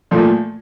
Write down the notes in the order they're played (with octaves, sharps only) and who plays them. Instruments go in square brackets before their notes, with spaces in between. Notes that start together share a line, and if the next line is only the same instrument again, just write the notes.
[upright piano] A#2 F3 A3